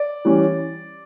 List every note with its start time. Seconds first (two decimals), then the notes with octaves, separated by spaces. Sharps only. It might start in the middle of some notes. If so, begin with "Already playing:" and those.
Already playing: D5
0.25 E3 G3 C#4